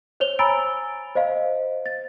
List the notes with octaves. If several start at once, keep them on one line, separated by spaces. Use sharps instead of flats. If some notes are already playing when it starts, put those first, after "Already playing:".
C5 C#5 F7 G7
G#5 A#5 B5 E6 A6 D7
C5 D#5 F5
A6